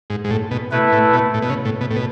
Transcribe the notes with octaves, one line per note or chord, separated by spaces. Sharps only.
G#2
G#2
A2
B2
B2 A3 E4 B4
A2
B2
A2
B2
C#3
A2
B2
A2
B2